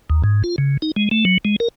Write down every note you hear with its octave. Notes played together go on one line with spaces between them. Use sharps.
D#2
G#2
F4
C#3
D#4
G#3
A3
F#3
G#3
A#4